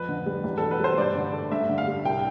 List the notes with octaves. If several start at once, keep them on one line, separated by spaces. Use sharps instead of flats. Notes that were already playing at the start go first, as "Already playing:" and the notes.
Already playing: F2 B4
D3
G3
E2
B2 A4
B4
G3 C5
G2 D5
D3
A3
G2 E5
D3
F5
G3
C2 G5